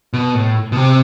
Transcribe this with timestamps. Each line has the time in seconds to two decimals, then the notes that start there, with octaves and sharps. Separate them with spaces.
0.13 B2
0.34 A2
0.72 B2
0.77 C3